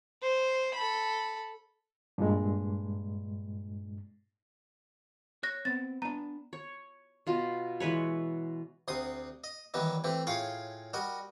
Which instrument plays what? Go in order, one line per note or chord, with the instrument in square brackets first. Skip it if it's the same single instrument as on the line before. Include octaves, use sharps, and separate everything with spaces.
[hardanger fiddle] C5
A4 B5
[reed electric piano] G2 A#2 G#3
[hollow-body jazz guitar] C#5 [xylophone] F#6 A#6
[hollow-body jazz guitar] B3 C4 [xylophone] A6
[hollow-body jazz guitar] B3 D4 [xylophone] A#5
[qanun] C#5
B2 F4
E3 G#3 B4 C#5
[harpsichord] D2 C3 C6 D#6
D#5
D#3 E3 F#3 G3 B3 D#4
E3 A3 C4 G4
A2 F4 G#4 C#5 F5 G5
G3 F#4 A#4 D#5